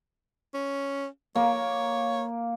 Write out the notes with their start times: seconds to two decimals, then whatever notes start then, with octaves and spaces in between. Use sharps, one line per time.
0.54 C#4
1.36 A#3 C#5